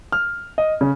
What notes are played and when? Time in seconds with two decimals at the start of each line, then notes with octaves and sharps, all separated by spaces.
0.12 F6
0.58 D#5
0.81 C#3